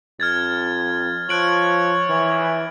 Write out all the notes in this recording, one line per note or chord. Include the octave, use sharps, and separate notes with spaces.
F2 F6 G#6 A6
F3 C#5 F#6 D7 F#7
E3